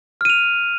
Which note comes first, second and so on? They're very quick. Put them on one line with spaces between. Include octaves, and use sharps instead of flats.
F6 D#7 F7